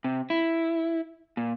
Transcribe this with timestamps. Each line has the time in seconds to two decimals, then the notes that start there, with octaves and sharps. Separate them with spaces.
0.04 C3
0.30 E4
1.37 A#2